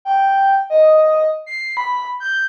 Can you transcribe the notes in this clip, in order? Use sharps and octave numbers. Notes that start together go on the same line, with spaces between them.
G5
D#5
C7
B5
G6